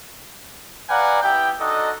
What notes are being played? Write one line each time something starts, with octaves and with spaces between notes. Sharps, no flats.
B4 D5 F5 F#5 G#5 A#5
B3 E4 G4 G5
D4 D#4 F#4 A4 D#5